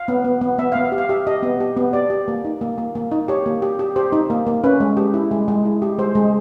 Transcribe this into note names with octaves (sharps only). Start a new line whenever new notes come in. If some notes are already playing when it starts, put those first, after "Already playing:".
Already playing: F5
B3
B3
B3
B3 E5
B3 F5
E5
G4
F5
G4 E5
G4 D#5
B3
G4
B3
G4 D5
G4
A#3
D#4
A#3
A#3
A#3
D#4
G4 C#5
A#3
G4
G4
G4 C5
D#4
A#3
A#3
C#4 B4
G#3
G4
E4
G#3
G#3
E4
G4
G#3 C5
G#3